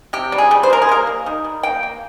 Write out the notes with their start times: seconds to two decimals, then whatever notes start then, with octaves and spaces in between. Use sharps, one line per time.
0.13 C3 G4
0.32 G3
0.38 G#4
0.51 G3
0.63 C5
0.70 G3 A#4
0.82 G#4
0.89 A#3 A#4
1.07 A#3
1.26 D#3
1.45 G3
1.63 A#3 G5
1.83 A#3